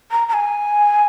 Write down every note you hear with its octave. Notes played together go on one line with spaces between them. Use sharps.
A#5
A#5
G#5